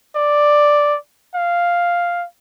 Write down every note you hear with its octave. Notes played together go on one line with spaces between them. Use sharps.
D5
F5